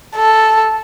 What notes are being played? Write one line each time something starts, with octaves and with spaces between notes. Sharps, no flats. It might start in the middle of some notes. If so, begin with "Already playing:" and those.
A4